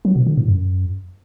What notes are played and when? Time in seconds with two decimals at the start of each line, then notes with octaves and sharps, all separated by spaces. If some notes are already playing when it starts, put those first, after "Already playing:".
0.05 F#3
0.16 B2
0.27 D3
0.37 A2
0.48 F#2